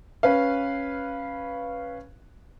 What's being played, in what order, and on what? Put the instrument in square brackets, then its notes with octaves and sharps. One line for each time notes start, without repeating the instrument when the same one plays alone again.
[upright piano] C#4 B4 F5